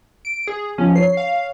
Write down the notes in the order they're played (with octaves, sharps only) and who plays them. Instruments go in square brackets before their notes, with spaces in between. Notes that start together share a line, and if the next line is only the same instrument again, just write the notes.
[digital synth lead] D7
G#4
[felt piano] F3 [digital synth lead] C#4
[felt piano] C#5 [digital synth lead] C7
[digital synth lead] F5